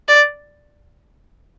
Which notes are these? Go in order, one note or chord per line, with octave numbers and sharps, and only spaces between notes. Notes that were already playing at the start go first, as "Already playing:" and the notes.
D5